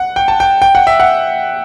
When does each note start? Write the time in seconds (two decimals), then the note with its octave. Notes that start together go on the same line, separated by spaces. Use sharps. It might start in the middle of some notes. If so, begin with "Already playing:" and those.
Already playing: F#5
0.16 G5
0.28 A5
0.40 G5
0.62 G5
0.75 F#5
0.87 E5
1.00 F#5